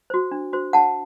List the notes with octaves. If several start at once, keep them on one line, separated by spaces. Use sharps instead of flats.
F#4 C5
D4
F#4 C5
D4 F#5 A5